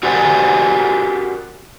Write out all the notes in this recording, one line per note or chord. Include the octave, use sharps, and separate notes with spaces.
F#4 G4 A#4 C5 D5 G#5